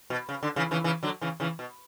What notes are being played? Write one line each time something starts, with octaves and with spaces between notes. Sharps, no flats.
B2
C#3
D3
C#3 E3
C#3 E3
C#3 E3
D3 F#3
C#3 E3
C#3 E3
B2